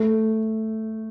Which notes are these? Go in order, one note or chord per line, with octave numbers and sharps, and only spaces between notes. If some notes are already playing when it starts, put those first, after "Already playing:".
Already playing: A3